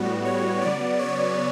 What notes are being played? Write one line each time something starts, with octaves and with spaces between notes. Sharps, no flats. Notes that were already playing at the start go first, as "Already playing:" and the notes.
Already playing: A2 G3 B3 F#4
C#5
C#3 F#3 B3 D5
C#5